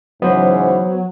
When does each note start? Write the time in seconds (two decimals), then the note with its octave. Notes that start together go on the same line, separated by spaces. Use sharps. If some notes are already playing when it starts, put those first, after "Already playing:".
0.22 G#2 C#3 E3 F#3 B3 C5